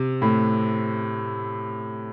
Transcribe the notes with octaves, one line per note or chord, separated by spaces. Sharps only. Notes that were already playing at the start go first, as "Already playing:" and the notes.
Already playing: C3
A2